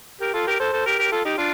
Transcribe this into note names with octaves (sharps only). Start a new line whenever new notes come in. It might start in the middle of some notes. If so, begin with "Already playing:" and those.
G4 A#4
F4 A4
G4 A#4
A4 C5
A4 C5
G4 A#4
G4 A#4
F4 A4
D#4 G4
D4 F4